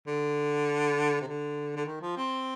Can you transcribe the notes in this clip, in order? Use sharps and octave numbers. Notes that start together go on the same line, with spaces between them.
D3
C3
D3
D3
D#3
F3
C4